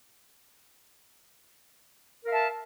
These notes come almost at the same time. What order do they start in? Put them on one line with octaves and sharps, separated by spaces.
A#4 F5 E5 A5